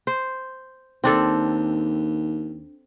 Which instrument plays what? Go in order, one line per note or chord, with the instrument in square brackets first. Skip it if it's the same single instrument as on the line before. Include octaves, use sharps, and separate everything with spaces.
[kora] C5
[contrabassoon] D#2 [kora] C4 D4 A4